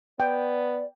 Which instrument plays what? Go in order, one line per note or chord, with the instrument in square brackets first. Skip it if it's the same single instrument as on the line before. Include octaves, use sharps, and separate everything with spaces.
[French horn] B3 [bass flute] D5 [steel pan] G5